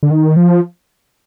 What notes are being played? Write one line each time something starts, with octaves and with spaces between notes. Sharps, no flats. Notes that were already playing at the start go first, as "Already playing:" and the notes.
D3
D#3
F3